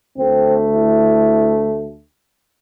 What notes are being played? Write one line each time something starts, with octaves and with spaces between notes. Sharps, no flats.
D2 D3 A3 C4
E4